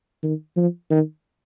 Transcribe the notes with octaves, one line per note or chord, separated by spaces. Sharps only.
D#3
F3
D#3